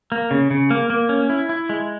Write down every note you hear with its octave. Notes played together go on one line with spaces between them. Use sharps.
A#3
C#3
C#3
A#3
A#3
C#4
E4
E4
G#3